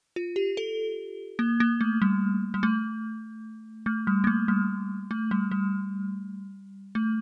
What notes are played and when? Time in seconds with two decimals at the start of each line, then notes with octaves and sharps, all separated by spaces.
0.16 F4
0.36 G4
0.57 A4
1.39 A#3
1.60 A#3
1.81 A3
2.02 G3
2.54 G3
2.63 A3
3.86 A3
4.07 G3
4.24 A#3
4.27 A3
4.48 G3
5.11 A3
5.31 G3
5.51 G3
6.95 A3